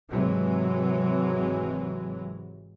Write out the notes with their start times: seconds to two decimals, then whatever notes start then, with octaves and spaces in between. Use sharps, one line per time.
0.10 G#1 C3 E3 F#3 G#3